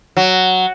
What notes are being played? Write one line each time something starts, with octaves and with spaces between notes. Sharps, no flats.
F#3